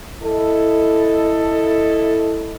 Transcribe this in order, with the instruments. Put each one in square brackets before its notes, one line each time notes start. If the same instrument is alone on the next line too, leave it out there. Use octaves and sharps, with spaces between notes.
[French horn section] E4 A4 D#5